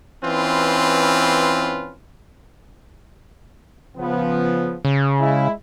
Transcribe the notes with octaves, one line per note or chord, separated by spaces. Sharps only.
E3 C4 C#4 F4 B4
C#3 F3 B3
C#3
G#3 E4